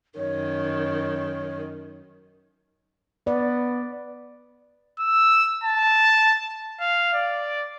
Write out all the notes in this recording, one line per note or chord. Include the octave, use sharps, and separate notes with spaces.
F#2 D#3 C#5
B3 D5
E6
A5
F5
D5